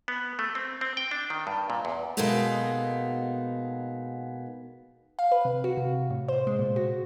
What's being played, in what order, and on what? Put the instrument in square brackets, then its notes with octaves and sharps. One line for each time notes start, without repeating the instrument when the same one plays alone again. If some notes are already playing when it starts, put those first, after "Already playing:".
[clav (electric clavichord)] B3
A3
C4
C4
G5
D4
D#3
G2
A#2
E2
[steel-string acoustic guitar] B2 G#3 A#3 B3 D#4 A4
[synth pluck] F5
B4
C3
F#4
C3
A2
C5
G#3
A#2
F#4